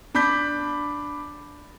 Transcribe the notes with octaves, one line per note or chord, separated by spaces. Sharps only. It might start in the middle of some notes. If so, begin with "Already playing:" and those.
D4 B5 D6 G6 B6